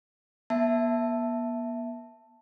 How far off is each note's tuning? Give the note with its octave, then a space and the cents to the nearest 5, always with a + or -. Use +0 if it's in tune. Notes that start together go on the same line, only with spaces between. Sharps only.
B3 -45 E5 +0 A5 +0